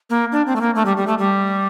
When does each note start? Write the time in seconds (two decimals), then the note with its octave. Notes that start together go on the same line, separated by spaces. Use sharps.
0.10 A#3
0.32 D4
0.47 C4
0.56 A3
0.61 A#3
0.75 A3
0.86 G3
0.97 G3
1.07 A3
1.18 G3